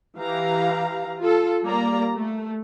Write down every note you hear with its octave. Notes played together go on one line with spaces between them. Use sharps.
E3 G4 F5 A#5
F4 A4
G3 A#3 D5 A#5
A3